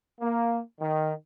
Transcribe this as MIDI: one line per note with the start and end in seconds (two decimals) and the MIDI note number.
0.20 0.59 58
0.80 1.11 51